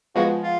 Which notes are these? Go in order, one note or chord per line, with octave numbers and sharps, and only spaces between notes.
F3 G#3 B3 F#4
F4